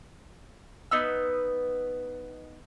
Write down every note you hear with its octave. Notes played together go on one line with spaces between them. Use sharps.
B3 D#4 B4 E6